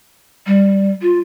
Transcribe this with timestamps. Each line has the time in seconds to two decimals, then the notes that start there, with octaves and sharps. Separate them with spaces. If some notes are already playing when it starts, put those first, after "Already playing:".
0.47 G3
1.02 F4